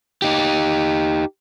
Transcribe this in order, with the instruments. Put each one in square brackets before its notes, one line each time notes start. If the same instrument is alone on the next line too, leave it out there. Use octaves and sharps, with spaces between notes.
[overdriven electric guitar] D#4 G4